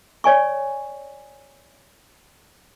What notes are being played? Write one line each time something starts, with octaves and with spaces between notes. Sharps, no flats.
C#5 D5 G#5 C#6